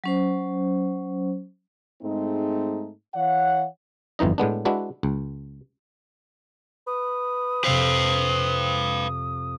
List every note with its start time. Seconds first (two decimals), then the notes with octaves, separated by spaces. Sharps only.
0.04 F#3 C#4 C5
2.02 G#2 G#3 A3 C4 D#4
3.15 E3 C#5 F5 F#5
4.19 G1 F2 E3 D#4 D#5
4.38 A2 G#3 B3 D4
4.65 G#3 D4 E4 F#4 B4
5.03 C#2
6.87 B4 D#6
7.64 F2 C3 C4 B4 F5 E6